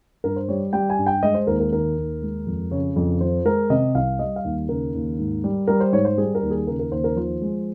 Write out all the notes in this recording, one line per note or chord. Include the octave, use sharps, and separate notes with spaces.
G2 A#4
C5
G3 C#5
G3 G5
G#5
G2
G5
G#3 D#5
C5
D#2 A#4
A#4
D#3 A#4
D#2
G#3
F2
C#3 C#5
F2
F3 C5
G#3 A#4
C3 D#5
C2 F5
G3 D#5
F5
D#2
C#3 A#4
D#2
G#2
G3
G3 A#4
C5
G#2 C#5
C5
G3 G#4
A#4
D#2
G#4
C#3 A#4
A#4
D#2 C5
A#4
F3 C5
G#3